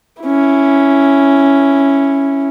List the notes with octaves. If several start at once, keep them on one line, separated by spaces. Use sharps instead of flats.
C#4 E4